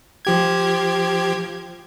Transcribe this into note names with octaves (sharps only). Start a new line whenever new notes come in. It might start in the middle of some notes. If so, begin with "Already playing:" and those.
F3 G4 G#6